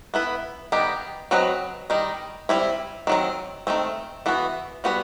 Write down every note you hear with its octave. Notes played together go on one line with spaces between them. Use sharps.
B3 E4 B4
D#3 G3 B3 D#4 G4
F#3 C4 F#4 B4 D#5
D#3 G3 D#4
G3 C4 E4
D#3 F#3 C4
D#3 A3 C4
E3 B3 F#4
G3 B3 F#4 B4